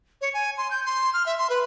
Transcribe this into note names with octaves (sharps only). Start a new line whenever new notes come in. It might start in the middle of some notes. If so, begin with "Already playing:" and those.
C#5
G#5
C6
G6
C6
F6
E5
C6
B4